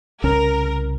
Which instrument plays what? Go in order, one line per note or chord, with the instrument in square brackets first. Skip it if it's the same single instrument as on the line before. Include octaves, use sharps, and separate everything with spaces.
[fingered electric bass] C2 C#3 C#4 [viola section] A#4